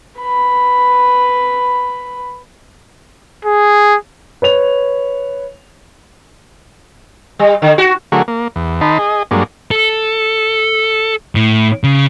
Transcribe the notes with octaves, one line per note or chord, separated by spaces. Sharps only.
B4 B5
G#4
B4 C#5 F7
G3
D3
F#4
D3 F#3 A3 F#4 G#4 A#4
A#3
E2
D#3 D#4 A5 B5 C6
G#4 D#5
G2 F#3 G#3 A#3 D4
A4
A2
C#3